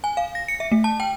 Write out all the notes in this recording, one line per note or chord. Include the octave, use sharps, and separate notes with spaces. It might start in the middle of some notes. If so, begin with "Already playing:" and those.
G#5
F5
A#6
C#7
E5
A3
A5
G5